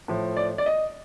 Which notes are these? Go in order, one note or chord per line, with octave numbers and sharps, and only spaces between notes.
A2 F3
D5
D5
D#5